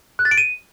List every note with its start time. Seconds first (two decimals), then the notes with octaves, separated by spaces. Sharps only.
0.19 F#6
0.25 A6
0.31 D7
0.37 D#7